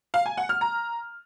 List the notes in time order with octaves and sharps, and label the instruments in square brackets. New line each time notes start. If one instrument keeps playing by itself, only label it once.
[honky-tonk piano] F5
G#5
F#5
F6
A#5